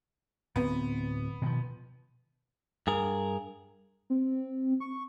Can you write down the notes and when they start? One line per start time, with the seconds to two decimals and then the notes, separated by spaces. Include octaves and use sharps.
0.56 D1 B3 C4
1.42 B2 D#3 F3
2.87 G2 G#4 A#4
4.10 C4
4.80 C#6